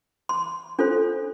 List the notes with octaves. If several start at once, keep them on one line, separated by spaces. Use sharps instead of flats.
C6
D4 F4 A4 C5